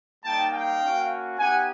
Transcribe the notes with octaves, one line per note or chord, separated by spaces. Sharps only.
G3 A#3 D#4 G5 A5
F5 G5
A#3 C#4 F#4
B3 D#4 G4 F#5 G#5